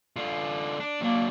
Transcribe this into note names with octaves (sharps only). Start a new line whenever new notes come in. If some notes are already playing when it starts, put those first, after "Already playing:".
D3 F4
D4
F#3 A#3 D4